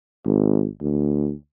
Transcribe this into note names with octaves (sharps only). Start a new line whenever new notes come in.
G#1
D2